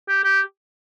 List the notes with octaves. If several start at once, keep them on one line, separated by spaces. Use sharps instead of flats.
G4
G4